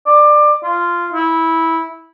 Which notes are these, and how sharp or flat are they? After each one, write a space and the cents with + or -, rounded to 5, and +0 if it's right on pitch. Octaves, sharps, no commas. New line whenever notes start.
D5 +20
F4 -10
E4 -15